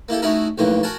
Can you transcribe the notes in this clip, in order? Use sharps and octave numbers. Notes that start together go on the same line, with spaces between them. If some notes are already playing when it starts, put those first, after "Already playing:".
A#3 E4 G4 A4
A3 C#4 D#4 E4 F#4 A#4
B1 F2 A2 E3 A#3 G4
F#4 A#4 G#5 A5